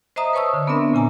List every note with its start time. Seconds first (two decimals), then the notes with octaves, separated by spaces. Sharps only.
0.16 C5 D#5 E5 A#5 D#6
0.33 B4 C#5 A5 C#6 D#6 E6
0.53 D3
0.67 B3 C4 D4 A#4 E5
0.93 A#2 C#3 G#5 A#5